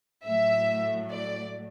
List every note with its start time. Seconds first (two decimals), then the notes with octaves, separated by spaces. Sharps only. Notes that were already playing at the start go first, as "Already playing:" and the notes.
0.24 A2 F#3 A3 E5
1.11 D5